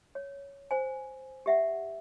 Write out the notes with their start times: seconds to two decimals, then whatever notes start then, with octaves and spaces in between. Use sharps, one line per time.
0.15 C#5
0.71 C5 G#5
1.46 G4 E5 F#5